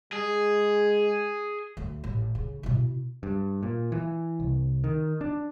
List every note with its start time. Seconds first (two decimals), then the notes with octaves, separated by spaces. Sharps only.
0.13 G#3 G#4
1.77 D2
2.04 A1
2.35 C#3
2.63 B2 E4
3.23 G2
3.63 A#2
3.92 E3
4.40 C2
4.84 D#3
5.21 D4